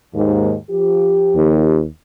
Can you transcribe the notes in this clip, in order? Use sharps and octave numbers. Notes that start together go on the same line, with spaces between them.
D#2 G#2
F3 G4
D#2